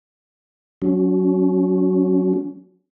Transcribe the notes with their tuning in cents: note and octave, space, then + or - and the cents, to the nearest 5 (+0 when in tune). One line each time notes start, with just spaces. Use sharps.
F#3 +0 C#4 +30 F#4 +0